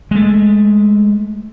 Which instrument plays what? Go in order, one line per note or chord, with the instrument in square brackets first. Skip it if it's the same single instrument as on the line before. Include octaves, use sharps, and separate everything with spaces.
[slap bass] G#3 A3